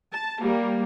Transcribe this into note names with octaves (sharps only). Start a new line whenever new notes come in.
A5
G3 A#3